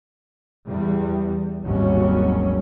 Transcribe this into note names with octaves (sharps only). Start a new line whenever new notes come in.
E2 G3
G#1 D#2 F#3 G3 C#4